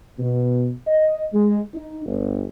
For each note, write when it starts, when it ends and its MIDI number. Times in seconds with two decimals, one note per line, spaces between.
0.19 0.70 47
0.87 1.26 75
1.34 1.64 56
1.74 2.03 63
2.06 2.45 31